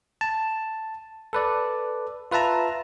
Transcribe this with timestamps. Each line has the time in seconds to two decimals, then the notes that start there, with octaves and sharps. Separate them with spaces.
0.21 A5
1.33 A4 B4 D5
2.31 F4 B4 E5 A5 A#5